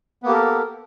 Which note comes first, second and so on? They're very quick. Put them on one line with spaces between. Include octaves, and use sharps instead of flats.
B3 A#3 G4 A4 A#4